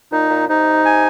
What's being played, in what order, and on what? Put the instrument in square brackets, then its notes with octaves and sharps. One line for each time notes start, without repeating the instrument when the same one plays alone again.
[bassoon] A#2 [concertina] D#4
[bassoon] A#2
[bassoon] C3 [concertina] D#4
[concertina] G#5